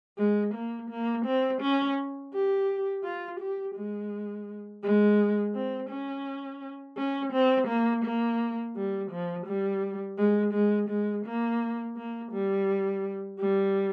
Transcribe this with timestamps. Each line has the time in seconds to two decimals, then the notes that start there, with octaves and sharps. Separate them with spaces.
0.18 G#3
0.54 A#3
0.90 A#3
1.25 C4
1.62 C#4
2.34 G4
3.04 F4
3.40 G4
3.76 G#3
4.83 G#3
5.55 C4
5.90 C#4
6.97 C#4
7.33 C4
7.68 A#3
8.05 A#3
8.76 G3
9.11 F3
9.46 G3
10.18 G#3
10.54 G#3
10.89 G#3
11.26 A#3
11.97 A#3
12.32 G3
13.40 G3